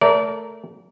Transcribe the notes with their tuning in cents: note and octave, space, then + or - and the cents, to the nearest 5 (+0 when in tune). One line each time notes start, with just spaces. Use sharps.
A3 +0 A#4 +0 D5 -35